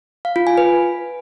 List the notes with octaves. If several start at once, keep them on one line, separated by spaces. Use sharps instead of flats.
F5
F4
G#5
B4